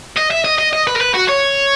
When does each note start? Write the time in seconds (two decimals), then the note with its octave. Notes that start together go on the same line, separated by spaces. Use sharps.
0.17 D#5
0.31 E5
0.44 D#5
0.59 D#5
0.73 D#5
0.87 B4
0.96 A#4
1.01 B4
1.14 F#4
1.28 C#5